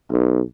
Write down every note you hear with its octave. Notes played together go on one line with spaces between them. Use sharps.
B1